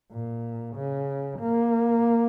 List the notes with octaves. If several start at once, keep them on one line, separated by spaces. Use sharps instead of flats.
A#2
C#3
A#3